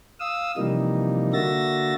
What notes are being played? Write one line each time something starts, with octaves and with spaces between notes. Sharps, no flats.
F5 D#6 E6
C3 E3 F3 G3 A#3 D#4
D3 A#3 F#4 E5 A6 A#6